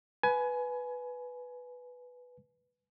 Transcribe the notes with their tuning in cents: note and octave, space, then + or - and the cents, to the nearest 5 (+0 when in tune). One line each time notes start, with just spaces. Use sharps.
B4 +0 G#5 +25